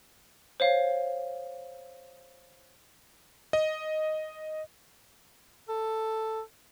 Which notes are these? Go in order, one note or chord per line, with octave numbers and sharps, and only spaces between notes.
C5 C#5 F5
D#5
A4